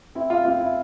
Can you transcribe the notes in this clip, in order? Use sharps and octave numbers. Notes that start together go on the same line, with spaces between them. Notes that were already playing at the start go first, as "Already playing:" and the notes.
C4 E4
F4
C4 F4
E4